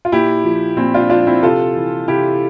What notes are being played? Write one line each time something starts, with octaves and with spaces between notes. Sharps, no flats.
F4
A#2 E4 G4
F3
A#2 C4 E4
D4 F4
F3 D4 F4
C4 E4
C3 F4 A4
E3
C3 E4 G4